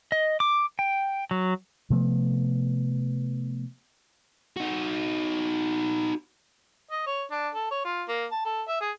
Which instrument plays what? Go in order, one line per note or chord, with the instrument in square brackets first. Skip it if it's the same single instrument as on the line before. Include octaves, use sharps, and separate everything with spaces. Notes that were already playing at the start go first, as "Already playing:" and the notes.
[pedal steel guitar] D#5
D6
G5
F#3
[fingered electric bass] C3 F3 A3 B3
[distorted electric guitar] D#4 F#4
[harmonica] D#5
C#5
D4
A4
C#5
F4
A#3
A5
A4
E5
G#4